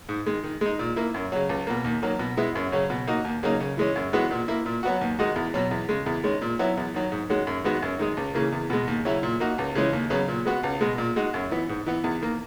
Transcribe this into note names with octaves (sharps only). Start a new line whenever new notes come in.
G#2
D#3 G#3
D#3
G#3 D#4
A#2
A#3 E4
F#2
C#3 F#3
C#2
B2 A#3
D#2
D#3 F#3 A#3
B2
G#3 B3 E4
F#2
C#3 F#3 C#4
B2
A#3 D#4 F#4
D#2
C#3 F#3 A#3 D#4
C#3
E3 G#3 C#4
F#2
E3 G#3 B3 F#4
A#2
A#3 E4
A#2
F#3 B3 F#4
D#2
D#3 G#3 D#4 F#4
E2
B2 F#3
E2
C#3 G#3
E2
D#3 G#3 C#4
A#2
F#3 B3 E4
E2
D#3 F#3
G#2
D#3 G#3 C#4 F#4
F#2
D#3 G#3 B3 F#4
F#2
D#3 G#3 D#4
C#2
C#3 E3 A#3
E2
B2 G#3
D#2
C#3 F#3 C#4 E4
A#2
A#3 D#4 F#4
C#2
C#3 E3 G#3 C#4
D#2
C#3 F#3 B3
A#2
G#3 B3 F#4
C#2
B2 G#3
A#2
G#3 D#4 F#4
F#2
E3 B3
G#2
E3 B3
E2
D#3 A#3